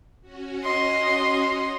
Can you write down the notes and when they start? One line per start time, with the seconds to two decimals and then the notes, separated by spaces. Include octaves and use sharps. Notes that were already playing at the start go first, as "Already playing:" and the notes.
0.21 C#4 F#4
0.64 D#5 C6